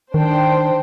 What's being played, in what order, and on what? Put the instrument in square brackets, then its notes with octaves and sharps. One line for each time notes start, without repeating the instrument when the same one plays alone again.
[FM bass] D#3 [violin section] D4 C5 G5